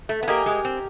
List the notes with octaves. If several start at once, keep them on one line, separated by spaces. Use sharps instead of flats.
A3
B3
A#3 G4 A#4 D#5 G#5
G#3
C4